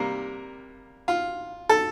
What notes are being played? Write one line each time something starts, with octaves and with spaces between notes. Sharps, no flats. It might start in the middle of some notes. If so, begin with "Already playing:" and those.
Already playing: C3 G3 A#3 A#4
F4
A4